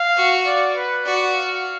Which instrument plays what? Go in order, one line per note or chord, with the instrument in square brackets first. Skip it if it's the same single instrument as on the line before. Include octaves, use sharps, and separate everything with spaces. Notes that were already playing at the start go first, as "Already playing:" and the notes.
Already playing: [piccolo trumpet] F5
[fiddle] F#4
[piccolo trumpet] D5
B4
[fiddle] F#4 [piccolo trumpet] D5
[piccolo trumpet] F5